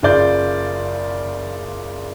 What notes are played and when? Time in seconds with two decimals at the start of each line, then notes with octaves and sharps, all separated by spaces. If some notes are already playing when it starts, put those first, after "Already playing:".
0.03 F#1 C#3 F4 D5 G6